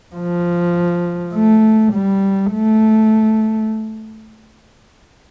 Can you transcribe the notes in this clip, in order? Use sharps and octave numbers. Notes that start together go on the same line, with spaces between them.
F3
A3
G3
A3